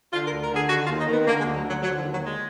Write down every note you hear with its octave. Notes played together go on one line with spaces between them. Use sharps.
D3 F4
A#4
D2
A#4
D3 G#4
D#3 F#4
F4
D#2
D#4
D#3 B3
D3 A#3
G#3
D2
F#3
D3
F#3
D3 F#3
F3
D#2
F#3
D3 G#3